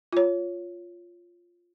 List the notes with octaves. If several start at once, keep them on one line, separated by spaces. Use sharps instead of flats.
F4 C#5